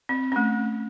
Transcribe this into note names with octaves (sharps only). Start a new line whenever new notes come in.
C4
A3 C#4